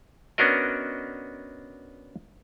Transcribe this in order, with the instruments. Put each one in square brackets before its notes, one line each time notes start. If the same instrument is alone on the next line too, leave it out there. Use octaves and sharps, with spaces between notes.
[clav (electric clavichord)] B3 C#4 D4 F#4 A#4 D#5